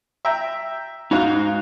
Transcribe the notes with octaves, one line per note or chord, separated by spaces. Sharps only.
E5 G5 A#5
G#2 D#4 F#4 F5